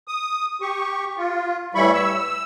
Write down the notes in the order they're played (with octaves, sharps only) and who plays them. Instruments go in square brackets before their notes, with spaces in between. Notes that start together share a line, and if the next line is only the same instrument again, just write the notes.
[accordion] D#6
G4 C#6
F4
A2 E3 G3 E4 B5 C#6
E6